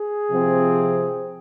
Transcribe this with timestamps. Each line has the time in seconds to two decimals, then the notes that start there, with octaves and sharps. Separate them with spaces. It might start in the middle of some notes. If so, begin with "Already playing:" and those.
Already playing: G#4
0.30 C3 F3 C4